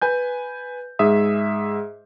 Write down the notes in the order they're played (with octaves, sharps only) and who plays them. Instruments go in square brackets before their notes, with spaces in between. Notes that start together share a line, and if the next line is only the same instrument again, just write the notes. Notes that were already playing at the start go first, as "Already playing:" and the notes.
[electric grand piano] B4 G#5 G6
G#2 G#4 E5 D#6